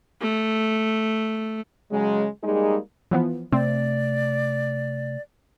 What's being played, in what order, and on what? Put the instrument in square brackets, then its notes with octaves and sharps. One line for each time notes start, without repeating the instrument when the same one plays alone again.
[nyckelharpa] A3
[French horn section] C#3 F#3 G#3
G3 G#3 A#3 D#4 G#4
[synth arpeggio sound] E3 F3 B3
[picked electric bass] C3 A3 [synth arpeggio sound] C4 [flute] D5